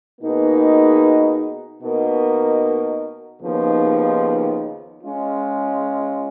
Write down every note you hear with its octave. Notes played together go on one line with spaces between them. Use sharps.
B2 A#3 D#4 G#4 B4
B2 A#3 D#4 A#4
D#2 C#3 F3 B3 D#4
G#3 C#4 F4